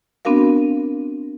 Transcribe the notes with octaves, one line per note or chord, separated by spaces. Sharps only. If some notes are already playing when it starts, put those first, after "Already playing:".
B3 C4 D4 F#4 A#4 F5